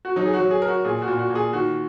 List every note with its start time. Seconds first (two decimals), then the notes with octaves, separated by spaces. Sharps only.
0.05 F#4
0.16 F#3 D#4
0.26 G#4
0.33 F#4
0.40 F#3
0.51 G#4
0.62 A#4
0.68 F#4
0.85 A#2 G#4
1.02 F#4
1.08 A#2
1.18 F#4
1.30 A#2
1.35 G#4
1.53 D#3 F#4